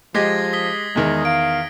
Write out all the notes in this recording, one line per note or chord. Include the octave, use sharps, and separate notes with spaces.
F3 G#3 G4 D#5 G#6 A#6 C7
D#6 B6 G7
E2 D#3 G#3
F5 D7